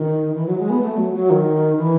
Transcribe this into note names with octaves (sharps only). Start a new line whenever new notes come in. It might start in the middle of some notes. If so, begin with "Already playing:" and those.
Already playing: D#3
E3
F#3
G#3
B3
A3
F#3
F#3
D#3
E3